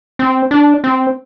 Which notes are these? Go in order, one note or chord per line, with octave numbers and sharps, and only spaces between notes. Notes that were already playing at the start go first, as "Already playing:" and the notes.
C4
D4
C4